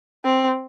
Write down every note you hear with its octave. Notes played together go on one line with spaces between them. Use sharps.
C4